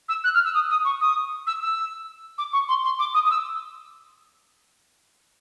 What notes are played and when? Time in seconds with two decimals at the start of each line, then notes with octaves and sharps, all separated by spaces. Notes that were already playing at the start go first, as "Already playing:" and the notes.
0.09 E6
0.24 F#6
0.34 F6
0.45 E6
0.54 D#6
0.70 D#6
0.85 C#6
1.01 D#6
1.47 E6
1.62 E6
2.38 D6
2.53 C#6
2.69 C6
2.85 C6
2.99 D6
3.14 D#6
3.25 D#6
3.31 E6